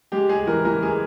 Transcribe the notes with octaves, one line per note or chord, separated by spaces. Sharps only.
G#3 G4
G#3 G#4
E3 A#4
E3 A#4
G#3 G#4